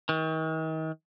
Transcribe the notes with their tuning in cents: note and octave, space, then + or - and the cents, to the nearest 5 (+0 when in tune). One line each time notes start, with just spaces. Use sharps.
D#3 +40